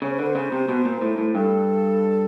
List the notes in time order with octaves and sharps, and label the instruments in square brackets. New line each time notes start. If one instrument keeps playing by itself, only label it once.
[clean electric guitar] C#3 [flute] C#5
[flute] C5
[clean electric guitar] D3 [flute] B4
[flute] C5
[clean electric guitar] C#3
C3
B2
A#2
A2
A2
[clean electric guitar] G2 [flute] A4